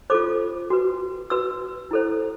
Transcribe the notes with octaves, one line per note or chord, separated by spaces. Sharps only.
F4 A4 C5 D6
F#4 B4
F#4 B4 E6
E4 A4 C5